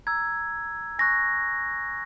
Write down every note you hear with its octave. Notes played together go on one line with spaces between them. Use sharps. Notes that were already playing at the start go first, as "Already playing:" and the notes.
A#5 E6 G#6
G#5 C#6 F#6 A#6